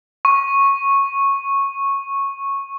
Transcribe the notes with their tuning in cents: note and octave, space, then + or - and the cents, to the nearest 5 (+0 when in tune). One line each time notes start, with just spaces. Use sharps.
C#6 -10